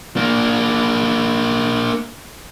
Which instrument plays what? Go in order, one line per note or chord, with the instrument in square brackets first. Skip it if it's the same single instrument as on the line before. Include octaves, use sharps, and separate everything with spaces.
[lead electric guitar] A#3 D4